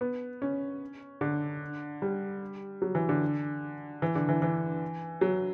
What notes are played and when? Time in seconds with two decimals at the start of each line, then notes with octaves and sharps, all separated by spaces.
0.01 B3
0.42 C#4
1.21 D3
2.02 G3
2.82 F#3
2.95 E3
3.09 D3
4.02 E3
4.15 D3
4.29 E3
4.42 E3
5.21 F#3